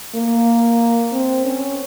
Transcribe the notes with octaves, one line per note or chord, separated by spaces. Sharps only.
A#3
C4
C#4